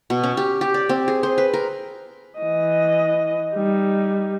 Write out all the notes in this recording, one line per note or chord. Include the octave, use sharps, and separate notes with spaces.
B2
C#4
G4
G4
D5
C4
G#4
C5
B4
A#4
E3 D#5
G3 D#4